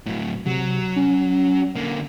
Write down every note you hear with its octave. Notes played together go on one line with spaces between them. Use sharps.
A2 F#3
C3 F#3
C#4
D3 A#3